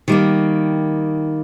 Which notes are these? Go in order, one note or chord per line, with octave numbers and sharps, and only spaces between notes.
D#3 G3 A#3